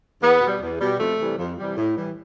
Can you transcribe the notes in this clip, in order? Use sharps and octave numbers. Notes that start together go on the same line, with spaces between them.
E2 B3
B2
G3
E2
B2 G3
F2 A3
C3 E3 G3
F2
C3 E3 G3
A2
E3 G3